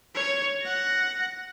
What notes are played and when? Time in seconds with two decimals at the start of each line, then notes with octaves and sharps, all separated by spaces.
0.15 C#5
0.62 F#5 A#6